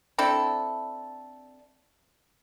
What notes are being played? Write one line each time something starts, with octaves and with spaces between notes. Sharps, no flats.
C4 D4 E4 A4